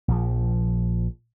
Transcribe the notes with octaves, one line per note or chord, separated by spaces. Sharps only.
A#1 F3